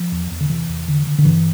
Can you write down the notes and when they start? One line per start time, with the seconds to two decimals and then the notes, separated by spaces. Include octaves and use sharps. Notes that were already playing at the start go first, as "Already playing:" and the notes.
Already playing: F3
0.12 E2
0.31 E2
0.41 D3
0.49 C3 E3
0.68 E2
0.88 D3
1.07 D3
1.18 D3
1.25 G2 E3